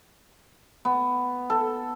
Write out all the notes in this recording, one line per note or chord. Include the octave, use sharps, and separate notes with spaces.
B3
A4